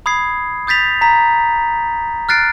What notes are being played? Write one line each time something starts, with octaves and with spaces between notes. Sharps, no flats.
B5 D#6 G#6 C7
D#6 G6 A6 B6 F7
A#5 B6
F6 F#6 A6 C7 D7